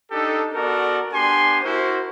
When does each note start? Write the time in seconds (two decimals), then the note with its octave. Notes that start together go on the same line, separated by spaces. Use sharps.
0.11 D4 D#4 G4 A4
0.54 B3 F#4 A4 A#4 D5
1.13 B3 D4 G4 G#5 C6
1.62 E4 F#4 A#4 C5